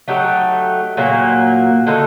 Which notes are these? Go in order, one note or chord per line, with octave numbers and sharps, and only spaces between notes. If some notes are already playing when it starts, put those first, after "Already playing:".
F#3 A3 D#4 G4
A#2 F#3 A#3
D3 A3 D#4 A4